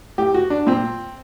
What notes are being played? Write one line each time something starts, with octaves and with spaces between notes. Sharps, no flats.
A2 G4
F#4
D4
A#2 C4